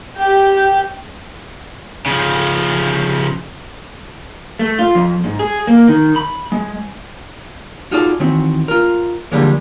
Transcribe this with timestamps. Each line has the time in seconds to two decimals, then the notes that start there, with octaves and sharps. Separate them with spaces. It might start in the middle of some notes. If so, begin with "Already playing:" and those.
0.18 G4
2.06 C#3 F3
4.59 A3
4.79 F4
4.95 F2
5.24 G#2
5.39 G#4
5.67 A#3
5.88 D#3
6.16 B5
6.52 G#3
7.91 D#4 F4 F#4 G#4 A4 D5
8.20 D#3 E3 C4 F#4
8.68 F4 A#4
9.32 D3 E3 F3 G3 G#3 A#3